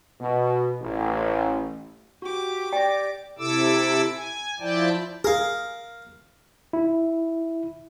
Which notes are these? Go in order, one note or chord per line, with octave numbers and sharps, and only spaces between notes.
B2
A1
F#4 G4 D6
D5 G5 A#6
C3 E4 A4 D6 E6
G#5
F3 E4 D5 G5 A5
G#4 A#4 F5
E4